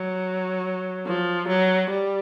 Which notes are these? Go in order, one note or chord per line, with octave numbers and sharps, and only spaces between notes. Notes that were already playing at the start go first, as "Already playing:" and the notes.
Already playing: F#3
F3
F#3
G3